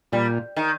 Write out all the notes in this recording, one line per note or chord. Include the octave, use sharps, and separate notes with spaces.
A#2 G3
D#3